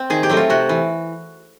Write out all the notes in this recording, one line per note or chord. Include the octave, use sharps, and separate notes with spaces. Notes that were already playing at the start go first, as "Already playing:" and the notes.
Already playing: C4
D#3 G#4
G4
F#3 A3 C4
F4
C3 F#4
E3